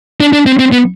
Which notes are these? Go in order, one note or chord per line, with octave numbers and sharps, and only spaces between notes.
D4
D4
C4
C4
B3